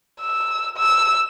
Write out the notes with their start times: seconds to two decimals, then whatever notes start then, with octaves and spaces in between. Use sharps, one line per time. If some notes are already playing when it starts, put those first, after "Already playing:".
0.21 E6
0.77 E6